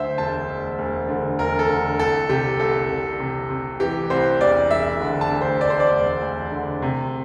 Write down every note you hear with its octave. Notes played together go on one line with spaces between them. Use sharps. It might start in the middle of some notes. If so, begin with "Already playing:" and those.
Already playing: D2 D3 C5 E5
E1 A5
E1
E1
D3
E1 A#4
A4
D3
C2 A4
C3 G4
C2 A4
C3
C3
C3
E3 G4
C2 C5
E1 D5
E1 E5
D3
A5
D2
C5
E1 D5
C5
D5
E1
E1
D3
C3